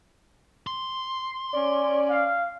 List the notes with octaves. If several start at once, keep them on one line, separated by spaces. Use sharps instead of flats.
C6
C#4 D5
F5